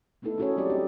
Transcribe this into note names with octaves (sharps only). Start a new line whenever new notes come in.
A3 B3 D#4 E4 A4
C#4 D#4 F#4 G#4 A4 C#5
F#3 C4 G4 A4 D5
D4 G4 D#5